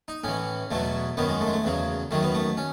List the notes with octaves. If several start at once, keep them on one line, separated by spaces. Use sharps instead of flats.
D#4
A2 E3 C#4
E2 B2 F#3 A3
F#2 D#3 F#3 B3
G#3
A3
G#3
A3
E2 C#3 F#3
F#2 D#3 F#3 A3
B3
A3
C#4